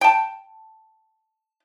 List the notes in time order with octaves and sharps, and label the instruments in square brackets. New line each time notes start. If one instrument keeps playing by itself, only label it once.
[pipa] G5 A5